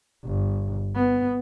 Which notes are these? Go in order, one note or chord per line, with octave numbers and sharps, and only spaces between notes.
G1
B3